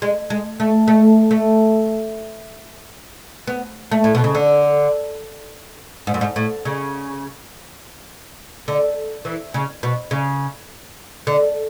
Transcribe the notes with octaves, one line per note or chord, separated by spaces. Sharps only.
G#3
G#3
A3
A3
A3
B3
A3
A2
B2
C#3
D3
G#2
F#2
G#2
A2
C#3
D3
E3
C#3
B2
C#3
D3